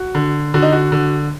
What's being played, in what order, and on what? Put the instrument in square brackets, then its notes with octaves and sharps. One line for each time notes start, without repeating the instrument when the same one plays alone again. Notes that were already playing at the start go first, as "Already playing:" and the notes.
Already playing: [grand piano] F#4
D3
D3 F#4
D#4
F#4
D3